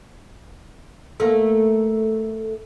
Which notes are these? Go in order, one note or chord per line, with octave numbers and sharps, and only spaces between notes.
A3 A#3